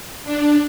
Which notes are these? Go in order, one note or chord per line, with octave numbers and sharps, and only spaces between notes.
D4